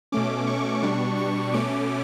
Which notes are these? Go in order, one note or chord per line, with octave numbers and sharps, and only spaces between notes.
B2 A3 C#4 D6
C#6
B2 G3 D4
C#6
B2 A3 C#4 D6